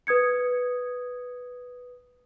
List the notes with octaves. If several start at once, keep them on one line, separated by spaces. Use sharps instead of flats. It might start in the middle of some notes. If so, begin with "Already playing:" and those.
B4 D#6 G#6 C#7